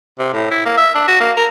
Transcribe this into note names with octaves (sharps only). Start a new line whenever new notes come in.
C3
A2
E4
A#3
E5
D4
F#4
A#3
A#4